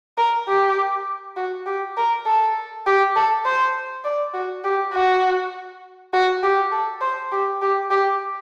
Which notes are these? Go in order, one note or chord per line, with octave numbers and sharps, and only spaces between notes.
A#4
G4
F#4
G4
A#4
A4
G4
A4
C5
D5
F#4
G4
F#4
F#4
G4
A4
C5
G4
G4
G4